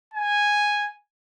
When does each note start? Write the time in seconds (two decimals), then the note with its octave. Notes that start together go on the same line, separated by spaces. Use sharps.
0.14 G#5